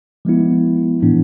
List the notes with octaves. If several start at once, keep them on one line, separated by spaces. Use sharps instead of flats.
F3 G#3 B3 E4
A2 E3 B3 D4